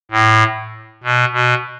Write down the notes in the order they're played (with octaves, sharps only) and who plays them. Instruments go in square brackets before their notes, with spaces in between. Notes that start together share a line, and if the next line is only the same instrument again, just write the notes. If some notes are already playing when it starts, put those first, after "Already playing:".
[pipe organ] A2
B2
B2